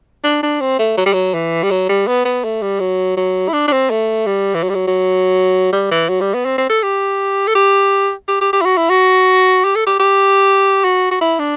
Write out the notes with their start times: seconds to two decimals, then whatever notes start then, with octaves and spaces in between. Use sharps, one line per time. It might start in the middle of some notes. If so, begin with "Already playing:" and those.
0.24 D4
0.43 D4
0.61 C4
0.79 A3
0.97 F#3
1.06 G3
1.13 F#3
1.34 E3
1.63 G3
1.71 F#3
1.89 G3
2.07 B3
2.25 B3
2.44 A3
2.62 G3
2.80 F#3
3.17 F#3
3.48 E4
3.53 D4
3.68 D4
3.72 C4
3.90 A3
4.26 G3
4.54 E3
4.63 F#3
4.69 G3
4.75 F#3
4.87 F#3
5.72 G3
5.91 E3
6.09 F#3
6.21 G3
6.34 B3
6.45 C4
6.58 C4
6.70 A4
6.83 G4
7.47 A4
7.55 G4
8.28 G4
8.41 G4
8.53 G4
8.61 E4
8.65 F#4
8.77 E4
8.90 F#4
9.64 G4
9.75 A4
9.87 G4
10.00 G4
10.84 F#4
11.11 F#4
11.21 E4
11.39 D4